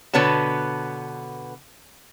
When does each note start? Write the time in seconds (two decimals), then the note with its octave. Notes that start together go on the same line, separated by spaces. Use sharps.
0.14 B2 D3 B3 C#5 A5